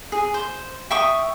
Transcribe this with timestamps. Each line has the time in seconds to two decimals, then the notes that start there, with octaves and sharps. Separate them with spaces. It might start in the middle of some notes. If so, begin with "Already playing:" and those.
0.12 G#4
0.34 C5
0.90 E5 G5 C#6 D#6